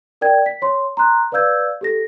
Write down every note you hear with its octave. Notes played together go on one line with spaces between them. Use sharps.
A#4 D5 G5 G#6
B6
C#5 C6
A#5 C6 F#6
B4 D5 F5 E6 G6 G#6
G4 A4 A#6